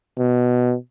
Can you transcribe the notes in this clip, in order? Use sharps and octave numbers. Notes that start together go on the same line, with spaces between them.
B2